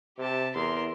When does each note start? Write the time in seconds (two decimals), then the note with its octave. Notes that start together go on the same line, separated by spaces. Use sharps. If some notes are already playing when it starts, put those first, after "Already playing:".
0.18 C3 G4 A5
0.55 E2 A#4 C6